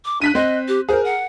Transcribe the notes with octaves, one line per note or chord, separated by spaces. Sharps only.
D6
D4 F#6 B6 D#7
C4 D#5
G4
G#4 A#4 C5
F#5